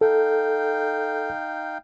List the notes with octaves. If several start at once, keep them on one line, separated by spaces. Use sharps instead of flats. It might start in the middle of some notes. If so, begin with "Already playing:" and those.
D#4 A4 F5 G5